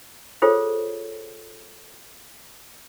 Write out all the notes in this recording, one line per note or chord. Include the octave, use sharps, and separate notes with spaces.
F4 G#4 A4 C5 C#5